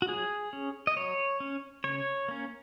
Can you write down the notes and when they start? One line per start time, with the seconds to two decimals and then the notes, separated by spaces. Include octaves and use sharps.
0.02 F#4
0.08 F#3 G#4
0.53 C#4
0.87 D#5
0.97 F#3 C#5
1.40 C#4
1.84 C#3 C#5
2.28 A#3 C#4